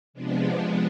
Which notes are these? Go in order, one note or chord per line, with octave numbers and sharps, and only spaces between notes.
C3 F3 G#3 B3 D4